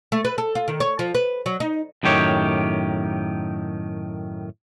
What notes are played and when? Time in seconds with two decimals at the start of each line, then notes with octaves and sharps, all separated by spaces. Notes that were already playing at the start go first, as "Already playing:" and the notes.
0.12 A3
0.25 B4
0.38 A4
0.55 F4
0.68 D#3
0.80 C#5
0.99 F3
1.15 B4
1.46 F#3
1.60 D#4
2.03 F#2 A2 D#3 G4 C#5